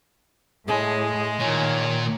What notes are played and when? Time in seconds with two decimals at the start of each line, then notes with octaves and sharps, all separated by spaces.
0.67 A2 G#3 G#4
1.40 A#2 D#3 A#3 C#5